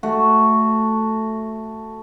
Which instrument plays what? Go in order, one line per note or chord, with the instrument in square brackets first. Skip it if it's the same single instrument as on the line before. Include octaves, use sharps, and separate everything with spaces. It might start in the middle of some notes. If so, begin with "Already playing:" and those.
[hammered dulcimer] A3 F#4